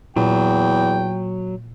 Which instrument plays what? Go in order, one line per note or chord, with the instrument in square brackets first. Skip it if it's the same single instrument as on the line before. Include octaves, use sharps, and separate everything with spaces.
[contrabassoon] E2 [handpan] A#2 [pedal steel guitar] F#3 [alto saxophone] G5